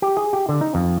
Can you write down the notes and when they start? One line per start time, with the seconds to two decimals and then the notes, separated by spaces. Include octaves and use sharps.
0.02 G4
0.17 G#4
0.33 G4
0.49 D3
0.61 D#4
0.75 F2